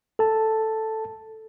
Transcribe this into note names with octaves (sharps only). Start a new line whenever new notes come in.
A4 A5